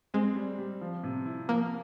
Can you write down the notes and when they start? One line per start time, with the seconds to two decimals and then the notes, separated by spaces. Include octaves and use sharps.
0.14 G#3 C4
0.36 G3
0.58 G3
0.81 F3
1.04 C3
1.26 E4
1.48 F3 A#3